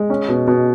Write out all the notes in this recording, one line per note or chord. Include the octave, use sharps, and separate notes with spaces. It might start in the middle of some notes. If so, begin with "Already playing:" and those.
Already playing: G#3
C#4
B2
B2